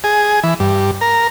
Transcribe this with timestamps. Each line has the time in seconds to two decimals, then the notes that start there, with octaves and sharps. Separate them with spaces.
0.04 G#4
0.43 E3
0.60 G2
1.01 A#4